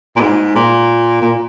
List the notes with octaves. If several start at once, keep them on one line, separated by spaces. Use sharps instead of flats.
A#2
G#2
A#2
A#2